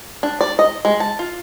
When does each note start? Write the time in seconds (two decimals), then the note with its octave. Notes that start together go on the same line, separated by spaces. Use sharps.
0.23 D4
0.41 D5
0.59 D#5
0.85 G#3
1.00 A5
1.19 F4